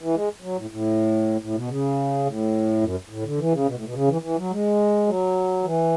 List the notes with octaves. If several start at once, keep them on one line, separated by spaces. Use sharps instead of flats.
E3
G#3
F#3
A2
A2
A2
B2
C#3
A2
F#2
A2
D3
E3
C#3
B2
A2
B2
C#3
E3
E3
F#3
G#3
F#3
E3